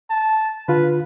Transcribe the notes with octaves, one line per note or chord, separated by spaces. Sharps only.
A5
D3 F4 B4